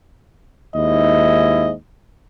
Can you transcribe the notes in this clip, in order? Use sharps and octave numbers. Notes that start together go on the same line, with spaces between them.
D#2 G#2 E4 D#5